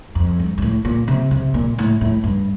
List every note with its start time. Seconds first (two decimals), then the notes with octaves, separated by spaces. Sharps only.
0.15 F2
0.39 G2
0.58 G2
0.62 A2
0.85 A#2
1.08 C3
1.31 C3
1.54 A#2
1.78 A2
2.01 A2
2.24 G2